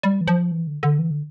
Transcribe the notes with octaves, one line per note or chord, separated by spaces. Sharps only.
G3
E3
F3
E3
D3
D3
E3
D3